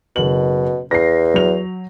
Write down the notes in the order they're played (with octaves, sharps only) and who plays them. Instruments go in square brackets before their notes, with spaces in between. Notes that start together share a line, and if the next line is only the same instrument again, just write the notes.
[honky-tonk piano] F#1 F#7 [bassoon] B2
[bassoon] E2 [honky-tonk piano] A#6 C7
[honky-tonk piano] F#3 F7